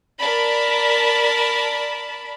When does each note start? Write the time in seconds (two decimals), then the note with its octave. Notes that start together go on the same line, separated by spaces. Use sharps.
0.18 A#4 D5 A5 B5